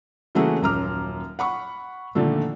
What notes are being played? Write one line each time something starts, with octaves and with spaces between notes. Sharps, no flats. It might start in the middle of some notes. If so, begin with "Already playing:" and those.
C#3 E3 A3 A#3 F#4 G#4
D#1 F#2 F#3 A#5 D6 F6
F#5 B5 C#6
A#2 D3 D#3 F3 A3